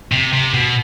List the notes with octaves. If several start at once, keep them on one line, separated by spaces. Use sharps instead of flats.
C3
C3
B2